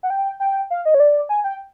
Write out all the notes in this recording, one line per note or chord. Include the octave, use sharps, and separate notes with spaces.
F#5
G5
G5
F5
D#5
C#5
D5
G#5
G5